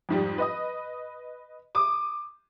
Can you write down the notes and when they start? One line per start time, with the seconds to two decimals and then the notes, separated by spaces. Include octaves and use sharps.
0.09 F2 G#2 G3
0.38 B4 D#5 D#6
1.75 D6 D#6